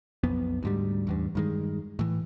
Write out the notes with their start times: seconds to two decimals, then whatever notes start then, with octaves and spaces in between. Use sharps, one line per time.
0.23 B1 F2 B3
0.63 D2 G#2 G3
1.07 A1 E2 G2
1.35 G2 D#3 G#3
1.99 A2 E3